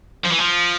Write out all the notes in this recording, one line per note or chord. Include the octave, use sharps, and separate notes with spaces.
F3
E3
F3